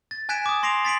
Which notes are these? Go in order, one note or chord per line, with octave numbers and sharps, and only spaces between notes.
A6
G#5 F#6 G#6 B6 D7 E7
D6 D#6
C6 A#6 C7 D7 F7
A6 B6 D7 F#7